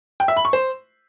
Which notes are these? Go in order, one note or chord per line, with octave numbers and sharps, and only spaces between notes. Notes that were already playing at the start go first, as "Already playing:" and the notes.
G5
E5
B5
C#6
C5